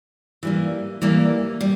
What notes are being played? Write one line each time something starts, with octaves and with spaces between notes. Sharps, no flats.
E3 G3 A#3
E3 G3 A#3
G3